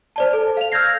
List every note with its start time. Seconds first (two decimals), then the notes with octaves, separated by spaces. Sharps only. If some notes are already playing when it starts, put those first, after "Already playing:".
0.16 C5 D5 A5
0.33 A4
0.57 F5 F7
0.72 E6 F6 G6 G#6 A#6 C7